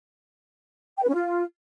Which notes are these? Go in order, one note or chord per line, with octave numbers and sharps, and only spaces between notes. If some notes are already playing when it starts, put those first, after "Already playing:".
G5
B4
C#4
F4